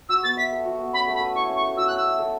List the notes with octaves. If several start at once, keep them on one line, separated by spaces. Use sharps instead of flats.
F#4 E6
B3 A6
E5 B6
A4
F#4
B3
C#4 B5
A3
B5
B4
E4 C#6
C#4
C#6
A3
F#4 E6
C#4 F#6
E6
E5
A4